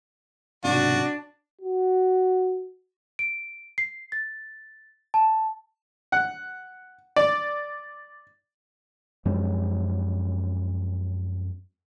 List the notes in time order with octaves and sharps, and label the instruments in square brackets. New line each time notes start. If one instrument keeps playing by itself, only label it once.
[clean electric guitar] B1 G#2 C3 [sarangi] D4 [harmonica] F#4
[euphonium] F#4
[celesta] D7
C7
A6
A5
[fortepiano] F#5
D5
[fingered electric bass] F#2 F3 G#3 C4